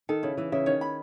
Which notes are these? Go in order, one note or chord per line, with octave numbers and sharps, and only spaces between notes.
D#3 A4
C#3 E4
E3 E4
C#3 E5
D#3 C#5
B5